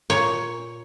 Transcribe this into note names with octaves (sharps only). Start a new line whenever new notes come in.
A#2 C#5